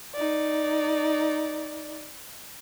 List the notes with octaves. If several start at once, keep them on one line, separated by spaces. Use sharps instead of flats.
D#4 D5